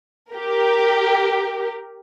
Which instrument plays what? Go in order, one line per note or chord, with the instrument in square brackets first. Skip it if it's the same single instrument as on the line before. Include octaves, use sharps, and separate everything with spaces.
[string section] G4 A#4